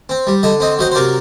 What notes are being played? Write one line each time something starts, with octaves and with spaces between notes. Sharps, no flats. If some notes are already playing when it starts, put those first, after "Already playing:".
C4
G3
D3 D#5
C4 D#5
F#3 C5 D#5
C5
C3 A#4 D5